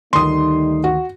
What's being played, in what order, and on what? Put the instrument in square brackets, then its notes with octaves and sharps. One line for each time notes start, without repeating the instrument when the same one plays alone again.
[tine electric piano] D2 D#3 [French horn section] G3 A3 D#4 [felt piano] C6 D#6
[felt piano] F#4